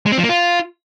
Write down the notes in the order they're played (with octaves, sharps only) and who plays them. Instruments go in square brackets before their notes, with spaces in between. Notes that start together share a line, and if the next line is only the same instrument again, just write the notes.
[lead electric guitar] G#3
C4
F3
A#3
F4